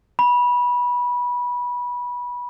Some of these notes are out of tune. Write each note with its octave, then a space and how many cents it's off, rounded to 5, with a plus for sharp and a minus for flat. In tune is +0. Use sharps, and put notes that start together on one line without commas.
B5 -20